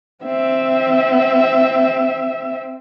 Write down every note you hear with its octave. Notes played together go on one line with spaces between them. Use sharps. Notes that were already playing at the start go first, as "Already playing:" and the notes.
C4 E5